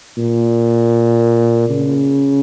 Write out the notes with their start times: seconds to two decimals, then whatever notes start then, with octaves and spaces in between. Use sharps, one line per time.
0.18 A#2
1.70 C#3